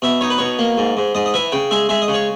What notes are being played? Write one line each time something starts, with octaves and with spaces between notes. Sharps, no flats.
B2 E5
D#4 C#5
B4
B2 C#5
A#3
G#2
G#2
G#2 D#5
D#5
E3 E5
C#3 G5
G#3 E5
G#3 E5
D#5
C#3
C#5